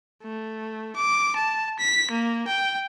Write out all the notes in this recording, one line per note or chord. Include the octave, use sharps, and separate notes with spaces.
A3
D6
A5
B6
A#3
G5